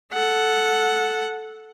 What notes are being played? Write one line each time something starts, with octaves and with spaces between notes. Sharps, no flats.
A4 F#5